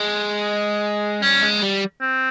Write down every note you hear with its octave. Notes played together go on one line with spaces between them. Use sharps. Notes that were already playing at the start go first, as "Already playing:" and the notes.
Already playing: G#3
G3 C#4
G#3
G3
C4